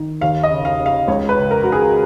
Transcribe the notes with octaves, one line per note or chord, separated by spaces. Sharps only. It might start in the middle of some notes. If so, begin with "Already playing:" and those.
Already playing: D#3
D#2 F5
D#5
C#3
F5
C#3
F5
C#2 C#5
B4
C#3
A#4
C#3 F#4
G#4